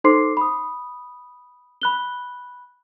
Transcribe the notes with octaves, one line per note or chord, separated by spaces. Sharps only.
D#4 A4 C5 C6 D6 C7
B5 D#6
B5 F#6 G7